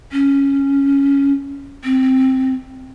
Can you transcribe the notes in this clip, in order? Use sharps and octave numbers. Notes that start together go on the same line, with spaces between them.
C#4
C4